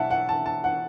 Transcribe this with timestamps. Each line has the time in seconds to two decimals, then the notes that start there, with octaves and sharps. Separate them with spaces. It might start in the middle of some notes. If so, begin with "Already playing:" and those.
Already playing: B2 F#3 E5 F#5 A5
0.11 F#5
0.29 A5
0.46 A5
0.64 F#5